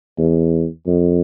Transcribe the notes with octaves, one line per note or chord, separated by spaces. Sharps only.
E2
F2